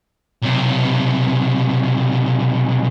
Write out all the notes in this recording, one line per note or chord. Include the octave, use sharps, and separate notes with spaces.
B1 C3